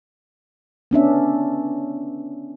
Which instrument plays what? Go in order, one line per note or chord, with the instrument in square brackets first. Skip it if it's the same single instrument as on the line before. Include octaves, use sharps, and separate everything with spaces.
[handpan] B3 C#4 D4 E5